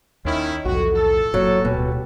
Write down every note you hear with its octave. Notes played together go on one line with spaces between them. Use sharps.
D#2 D#3 C#4 E4
B1 E2 A2 F3 F4 F#4
A4
F#1 F#3 A#3
D1 B2 G3